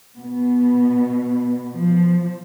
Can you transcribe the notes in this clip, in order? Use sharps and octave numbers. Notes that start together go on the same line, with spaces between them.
B2 B3
F3